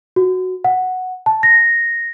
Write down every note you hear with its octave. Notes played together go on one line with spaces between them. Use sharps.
F#4
F#5
A5
A#6